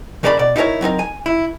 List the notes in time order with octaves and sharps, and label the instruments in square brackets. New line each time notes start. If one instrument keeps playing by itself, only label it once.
[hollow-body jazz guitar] D#2 C#3 A#4 D5 A#5 B5
B2 D5
D#4 E4 G4 G#4 A#4 C#5
F#3 C4 D#4 A#4
G#5
E4